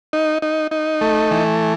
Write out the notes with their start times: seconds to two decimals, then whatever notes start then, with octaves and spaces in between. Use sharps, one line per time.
0.13 D#4
0.42 D#4
0.71 D#4
1.01 A3
1.31 E3